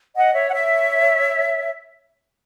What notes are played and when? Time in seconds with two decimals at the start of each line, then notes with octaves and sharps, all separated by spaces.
0.15 D#5 F#5
0.34 C#5 E5
0.49 F#5
0.53 C#5 E5